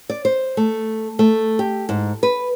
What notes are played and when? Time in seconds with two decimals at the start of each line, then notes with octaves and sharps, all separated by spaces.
0.10 D5
0.25 C5
0.57 A3
1.19 A3
1.59 G4
1.89 G#2
2.23 B4